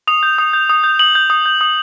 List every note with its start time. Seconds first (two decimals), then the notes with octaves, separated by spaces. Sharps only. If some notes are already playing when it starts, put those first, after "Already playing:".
0.07 D#6 F7
0.23 G6
0.38 D#6
0.53 G6
0.70 D#6
0.84 G6
0.99 D#6 F#7
1.15 G6
1.30 D#6
1.46 G6
1.61 D#6